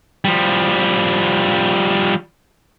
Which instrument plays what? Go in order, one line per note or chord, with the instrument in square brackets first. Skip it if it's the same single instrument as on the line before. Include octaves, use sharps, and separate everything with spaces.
[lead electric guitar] F3 G3